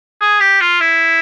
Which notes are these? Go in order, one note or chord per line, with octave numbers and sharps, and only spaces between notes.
G#4
G4
F4
E4